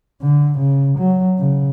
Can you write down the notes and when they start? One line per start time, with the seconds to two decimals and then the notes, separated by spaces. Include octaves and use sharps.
0.22 D3
0.58 C#3
0.99 F#3
1.39 C#3